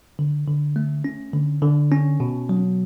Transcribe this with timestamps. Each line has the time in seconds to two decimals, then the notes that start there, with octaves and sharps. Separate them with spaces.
0.19 D3
0.47 D3
0.76 A3
1.04 C#4
1.33 D3
1.62 D3
1.92 C#4
2.20 B2
2.49 F#3